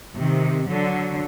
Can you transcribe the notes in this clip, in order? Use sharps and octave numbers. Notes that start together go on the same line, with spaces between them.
C3 D#3
D3 F#3